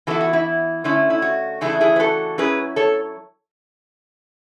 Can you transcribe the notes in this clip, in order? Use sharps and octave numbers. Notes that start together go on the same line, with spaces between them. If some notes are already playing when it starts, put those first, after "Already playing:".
E3 B3 E4 F#4 A4
F#4
E4
D3 A3 C#4 E4
E4
F#4
C#3 E3 A3 D4 E4 G#4
E4 G#4
B4
F#4 A4
F#3 C#4 E4 G#4 B4
A4 C#5